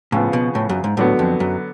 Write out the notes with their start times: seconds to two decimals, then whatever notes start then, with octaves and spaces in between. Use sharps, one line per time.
0.12 A2 C#3 F3 B3
0.33 B2
0.55 A2
0.69 F#2
0.84 G#2
0.97 A2 D3 F#3 B3
1.19 F2
1.40 F#2